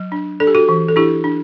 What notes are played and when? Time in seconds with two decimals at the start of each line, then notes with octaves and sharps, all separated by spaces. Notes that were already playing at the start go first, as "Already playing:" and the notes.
Already playing: F#3
0.12 D4
0.40 D4 A4
0.47 G4
0.55 F#4 A4
0.69 E3
0.89 A4
0.96 D4 E4 G4
1.24 D4